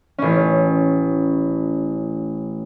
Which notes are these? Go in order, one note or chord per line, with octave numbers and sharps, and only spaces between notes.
A1 C#4